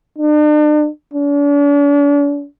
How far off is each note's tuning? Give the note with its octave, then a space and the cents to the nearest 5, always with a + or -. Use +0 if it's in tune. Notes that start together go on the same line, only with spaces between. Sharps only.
D4 +40
D4 -40